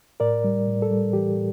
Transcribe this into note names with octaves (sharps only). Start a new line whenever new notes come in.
A2 A#4 D5
G3
A2
A4
G3
E3 G4
A2